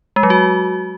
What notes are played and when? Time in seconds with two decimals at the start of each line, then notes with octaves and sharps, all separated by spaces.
0.16 G#3
0.23 F#3
0.30 F#4